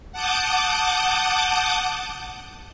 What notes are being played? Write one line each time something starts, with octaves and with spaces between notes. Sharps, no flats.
F#5 A5 D6 D#6 G6